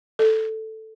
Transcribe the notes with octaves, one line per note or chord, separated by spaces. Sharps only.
A4